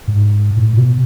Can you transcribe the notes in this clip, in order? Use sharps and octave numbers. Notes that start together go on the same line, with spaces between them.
G#2
A2
B2